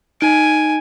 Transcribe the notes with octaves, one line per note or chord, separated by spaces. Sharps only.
D#4 G#5 D7